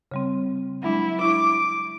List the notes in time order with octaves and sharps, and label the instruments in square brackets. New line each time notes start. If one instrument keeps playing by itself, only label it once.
[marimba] C#3 G3 C4
[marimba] F#3 G#3 D4 [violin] E4
[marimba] E4 C#6 [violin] D6